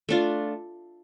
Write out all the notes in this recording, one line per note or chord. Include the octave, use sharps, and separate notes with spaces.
A3 D4 F4